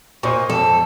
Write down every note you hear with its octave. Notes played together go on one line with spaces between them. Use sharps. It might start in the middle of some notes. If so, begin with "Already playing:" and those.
A#2 C5 D#5 C#6
F2 A4